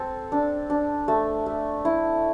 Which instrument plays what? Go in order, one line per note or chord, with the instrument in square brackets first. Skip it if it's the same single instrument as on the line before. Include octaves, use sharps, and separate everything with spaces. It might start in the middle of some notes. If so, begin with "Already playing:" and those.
Already playing: [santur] C4 A4
D4
D4
A3
A3
E4